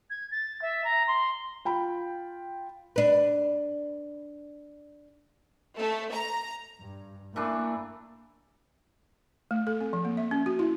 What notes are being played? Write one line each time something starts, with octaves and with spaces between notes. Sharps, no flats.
G#6
A6
E5
A#5
C6
F4 G5 B5
D4 B4
A3
A#5
G2
E3 A3 A#3 D4
A3
A4
C4
F3
A#3
E5
C#4
F#4
E4